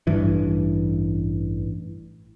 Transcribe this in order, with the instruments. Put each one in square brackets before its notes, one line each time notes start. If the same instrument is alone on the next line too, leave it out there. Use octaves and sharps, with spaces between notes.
[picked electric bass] A1 G2 E3